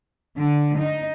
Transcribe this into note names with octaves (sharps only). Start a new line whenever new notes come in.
D3
D#4